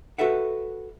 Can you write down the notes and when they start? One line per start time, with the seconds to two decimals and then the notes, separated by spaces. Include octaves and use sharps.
0.18 F#4 A4 B4 E5 F#5